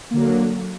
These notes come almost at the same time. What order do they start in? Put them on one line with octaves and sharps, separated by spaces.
A#3 D3 F#3